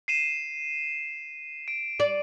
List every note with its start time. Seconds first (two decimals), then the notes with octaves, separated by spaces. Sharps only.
0.08 C7 D#7 E7
1.68 D7
2.00 D5